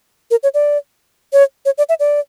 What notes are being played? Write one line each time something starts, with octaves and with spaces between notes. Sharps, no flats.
A#4
C#5
D5
C#5
C#5
D5
E5
D5